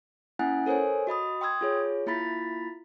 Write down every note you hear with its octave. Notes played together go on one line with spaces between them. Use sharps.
A#3 C#4 E4 F#5 G#5 F#6
A4 A#4 C5 C#5 G#5
F#4 D#5 B5 D#6
G5 C6 D#6 E6 G#6
F4 G#4 C#5
A#3 E4 F4 B5 A6 B6